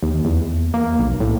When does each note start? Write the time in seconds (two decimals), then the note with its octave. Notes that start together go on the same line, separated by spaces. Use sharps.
0.03 D#2
0.25 E2
0.74 A#3
0.99 B1
1.20 A2